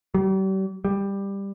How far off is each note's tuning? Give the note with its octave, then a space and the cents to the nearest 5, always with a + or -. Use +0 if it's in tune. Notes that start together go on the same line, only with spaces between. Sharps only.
G3 -40
G3 +15